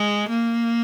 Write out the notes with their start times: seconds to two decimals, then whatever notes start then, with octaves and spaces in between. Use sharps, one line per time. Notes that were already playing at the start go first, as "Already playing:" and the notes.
Already playing: G#3
0.30 A#3